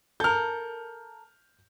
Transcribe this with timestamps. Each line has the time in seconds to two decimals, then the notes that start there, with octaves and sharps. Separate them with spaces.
0.20 A4 A#4 F6 G6